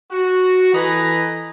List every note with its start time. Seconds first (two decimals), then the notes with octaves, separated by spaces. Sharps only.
0.10 F#4
0.74 E3 A4 B4 D#5 G#5 A#5